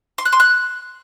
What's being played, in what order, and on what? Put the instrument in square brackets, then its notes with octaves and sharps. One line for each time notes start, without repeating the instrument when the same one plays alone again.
[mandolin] C6
F#6
C6
F#6